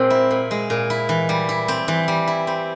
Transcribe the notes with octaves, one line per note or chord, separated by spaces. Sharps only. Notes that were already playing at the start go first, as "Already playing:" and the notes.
Already playing: A#2 G#3 C4
E4
A#2
G#3
A#2
E4
E3
G3
E4
C4
E3
G3
E4
C4